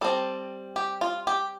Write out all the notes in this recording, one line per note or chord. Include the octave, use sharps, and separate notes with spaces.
G3 C4 A4
G4
F4
G4